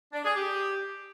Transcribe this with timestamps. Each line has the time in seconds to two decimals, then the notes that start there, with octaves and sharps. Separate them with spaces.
0.13 D4
0.24 G#4
0.35 G4